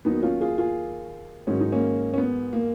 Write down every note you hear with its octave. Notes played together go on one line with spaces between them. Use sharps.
D#2 D#3 F#3 B3 D#4
C#4 F4
F4 G#4
F4 G#4
G#2 D#3 F#3 C#4
D#4
A#3 C#4
C#4
B3
A#3